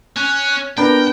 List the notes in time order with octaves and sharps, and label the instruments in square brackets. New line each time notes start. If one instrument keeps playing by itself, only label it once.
[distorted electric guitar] C#4 [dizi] F#6
[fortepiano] B3 [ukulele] D4 [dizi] A#4 [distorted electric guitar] G5